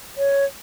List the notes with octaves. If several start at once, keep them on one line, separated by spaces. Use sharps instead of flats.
C#5